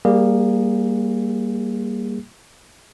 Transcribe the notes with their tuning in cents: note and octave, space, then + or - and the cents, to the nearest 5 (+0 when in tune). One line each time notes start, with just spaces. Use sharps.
G3 +5 A#3 +0 G#4 -25